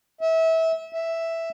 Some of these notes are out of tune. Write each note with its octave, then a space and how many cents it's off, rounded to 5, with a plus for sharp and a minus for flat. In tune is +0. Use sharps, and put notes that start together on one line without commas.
E5 -25
E5 +0